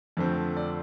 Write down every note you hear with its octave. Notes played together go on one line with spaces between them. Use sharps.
F2 D3 F3 A3 C4
D5